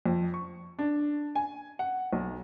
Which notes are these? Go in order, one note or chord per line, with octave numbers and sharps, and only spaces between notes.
F2
C#6
D4
G#5
F#5
B1